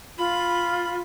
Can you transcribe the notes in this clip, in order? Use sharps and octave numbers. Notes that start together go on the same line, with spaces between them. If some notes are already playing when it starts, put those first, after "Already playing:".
F4 B5